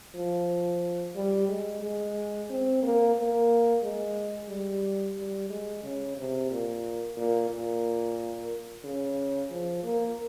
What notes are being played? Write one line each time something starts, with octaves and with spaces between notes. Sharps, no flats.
F3
G3
G#3
G#3
C4
A#3
A#3
G#3
G3
G3
G#3
C#3
C3
A#2
A#2
A#2
C#3
F3
A#3